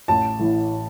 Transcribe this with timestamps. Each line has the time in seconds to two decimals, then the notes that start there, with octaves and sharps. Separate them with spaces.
0.08 A1 A5
0.39 A2 E3